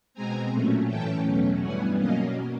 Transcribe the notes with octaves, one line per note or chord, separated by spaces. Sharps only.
B2 G#3 C4 G#5 A#5
A#2 F#3 A3 C#4
A2 E3 A3 C#4 G5 A5
E2 B2 F#3 A3 C#4
G2 E3 G3 B3 F#5 G#5
B2 F#3 A#3 C#4 D#5 F5